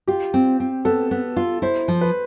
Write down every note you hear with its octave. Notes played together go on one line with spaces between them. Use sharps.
F4 G4
C4
C4
B3 A4
B3
F4
E4 C5
F3
B4